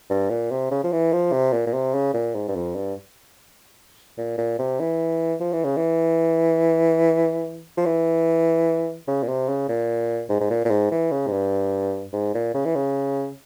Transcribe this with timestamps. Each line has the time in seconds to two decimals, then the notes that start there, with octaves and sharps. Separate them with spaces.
0.10 G2
0.30 A#2
0.51 C3
0.71 C#3
0.84 F3
0.92 E3
1.13 F3
1.32 C3
1.53 A#2
1.67 A#2
1.73 C3
1.94 C#3
2.14 A#2
2.35 G#2
2.48 G2
2.56 F2
2.75 G2
4.18 A#2
4.38 A#2
4.59 C3
4.80 E3
5.40 F3
5.53 E3
5.64 C#3
5.77 E3
7.77 F3
7.86 E3
9.08 C#3
9.23 A#2
9.28 C3
9.49 C#3
9.69 A#2
10.29 G#2
10.41 G#2
10.50 A#2
10.65 A#2
10.70 G#2
10.91 E3
11.11 C#3
11.27 G#2
11.32 G2
12.13 G#2
12.35 A#2
12.54 C#3
12.65 E3
12.75 C#3